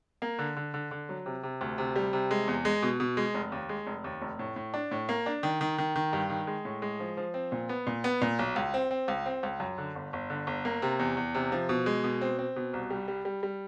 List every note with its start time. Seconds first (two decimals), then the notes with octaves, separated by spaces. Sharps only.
0.22 A#3
0.39 D3
0.56 D3
0.74 D3
0.91 D3
1.09 F#3
1.26 C3
1.43 C3
1.61 D2
1.78 C3
1.96 G3
2.13 C3
2.31 G#3
2.48 E2
2.65 G#3
2.83 B2
3.00 B2
3.17 G#3
3.34 F1
3.52 D#2
3.69 G#3
3.87 F1
4.04 D#2
4.22 F1
4.39 A2
4.56 A2
4.74 D4
4.91 A2
5.09 A#3
5.26 D4
5.43 D#3
5.61 D#3
5.78 D#3
5.96 D#3
6.13 G2
6.30 D#3
6.47 G#3
6.65 A2
6.82 G#3
7.00 F3
7.17 F3
7.34 C4
7.52 A#2
7.69 B3
7.87 A#2
8.04 B3
8.22 A#2
8.39 B1
8.56 C#2
8.74 C4
8.91 C4
9.08 C#2
9.26 C4
9.43 C#2
9.60 F#2
9.78 D3
9.95 G1
10.13 G1
10.30 D3
10.47 G1
10.65 A#3
10.82 C3
10.99 E2
11.17 E2
11.35 C3
11.52 F3
11.69 B2
11.86 G#3
12.04 B2
12.21 C4
12.39 C4
12.56 B2
12.73 C2
12.90 G3
13.08 G3
13.25 G3
13.43 G3